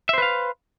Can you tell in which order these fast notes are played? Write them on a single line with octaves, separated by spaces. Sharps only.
E5 C5 B4 F5